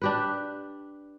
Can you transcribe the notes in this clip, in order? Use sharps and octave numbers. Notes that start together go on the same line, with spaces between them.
D4 G4 B4